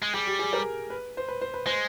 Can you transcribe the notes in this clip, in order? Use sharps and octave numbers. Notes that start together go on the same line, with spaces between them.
G#3
G3 G#4
G4
G#4
A#4
B4
C5
B4
C5
B4
G#3 C5